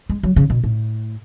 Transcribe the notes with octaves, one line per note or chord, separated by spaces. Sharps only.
G#3
F#3
C#3
B2
A2